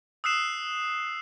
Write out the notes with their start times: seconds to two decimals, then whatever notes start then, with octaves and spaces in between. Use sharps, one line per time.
0.24 D#6 E6 F#6 C7 E7